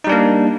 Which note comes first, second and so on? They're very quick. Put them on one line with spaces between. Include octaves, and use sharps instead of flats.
D#4 G3 D4 A#3